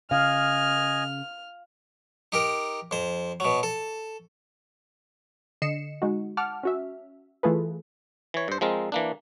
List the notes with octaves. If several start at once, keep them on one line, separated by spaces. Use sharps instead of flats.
C#3 D#5 F5 G#5 F6
D#4 G4 A#4
F2 C5
B2 F#3
A4
D3 D#5 C7 C#7 E7
G#3 D#4 F#4
F#5 A5 D6 F6
C#4 F#4 E5
E3 A3 F4 G#4 A4 B4
E3 C#5
G2 C5
F3 G#3 C4 A#4
E3 A#3 D4